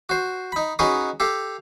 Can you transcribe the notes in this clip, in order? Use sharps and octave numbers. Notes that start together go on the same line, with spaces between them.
F#4 C5
D#4 B5
C#4 D#4 F#4 G#4 B4 C#5
G4 A4 F5